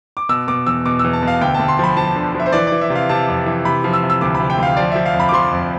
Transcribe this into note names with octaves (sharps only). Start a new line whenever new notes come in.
D6
B2 E6
B2 D6
E2 E6
B2 D6
E2 E6
A5
B2
F5
D2 G5
D2 A5
C6
F3 B5
F3 A5
D3
F3 E5
C5
E3 D5
D5
E3
E5
C3
F5
C3 A5
F2
E3
C3 B5
F3
E6
C3
E6
D2 D6
B5
C3
G5
D2 F5
F3 D5
F3 E5
F5
F2
B5
D6
F3 C6
F2